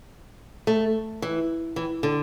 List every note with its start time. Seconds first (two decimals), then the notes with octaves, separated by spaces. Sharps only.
0.67 A3
1.22 E3
1.76 E3
2.03 D3